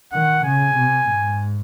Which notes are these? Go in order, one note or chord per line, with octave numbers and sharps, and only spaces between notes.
D#3 F#5
C#3 G#5
C3
G#2